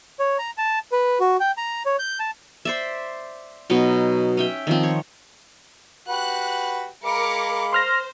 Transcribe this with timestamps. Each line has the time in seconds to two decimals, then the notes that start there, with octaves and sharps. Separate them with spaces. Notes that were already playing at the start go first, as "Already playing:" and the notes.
0.19 C#5
0.39 A#5
0.58 A5
0.92 B4
1.20 F#4
1.40 G5
1.57 A#5
1.86 C#5
1.99 G6
2.19 A5
2.65 C5 D5 E5
3.70 B2 F#3 D#4
4.37 C#4 E5 G5
4.67 D#3 F3 C4
4.83 C#5
6.09 F#4 G4 B4 F#6
7.04 G#3 A#4 F5 B5 D6 C#7
7.73 C5 C6 F6 A#6